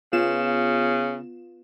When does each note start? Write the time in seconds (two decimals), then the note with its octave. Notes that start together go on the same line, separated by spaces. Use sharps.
0.13 C#3 B3 F4 E7